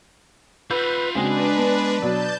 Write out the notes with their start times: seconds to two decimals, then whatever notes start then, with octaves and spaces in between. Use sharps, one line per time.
0.71 F4 B4 F#5 B5 E6 G6
1.15 C#3 G#3 C4 D4 F#4 B4 G#5
1.57 B3
2.02 B2 F#3 D5 A5 G6